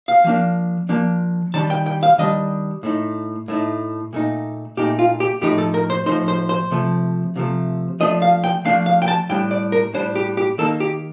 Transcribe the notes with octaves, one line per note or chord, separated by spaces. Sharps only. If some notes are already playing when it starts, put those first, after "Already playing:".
F5
F3 A#3 D4
F3 A#3 D4
D#3 G3 D4 A5
G5
G5
F5
D#3 G3 D4 D#5
A2 A3 D#4
A2 A3 D#4
A#2 A3 D#4
A#2 A3 D#4 G4
F4
G4
A2 F3 A3 D#4 G4
A4
A#4
C5
A2 F3 A3 D#4 C5
C5
C5
C3 F3 A3
C3 F3 A3
F3 A3 D4 D#5
F5
G5
F3 A3 D4 F5
F5
G5
A5
A2 G3 D4 G5
D5
A#4
A2 G3 D4 C5
G4
G4
D#3 A#3 D#4 A4
G4